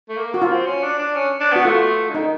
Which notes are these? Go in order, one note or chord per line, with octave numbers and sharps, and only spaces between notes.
A3
A#3
A#3 F#4
F4
C4
C#4
D4
D4
C#4
D4
B3 F#4
A3 F4
D3
D#3 D#4